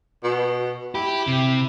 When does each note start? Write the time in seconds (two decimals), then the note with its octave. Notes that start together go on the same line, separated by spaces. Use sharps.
0.24 B2
0.95 E4 G4
1.27 C3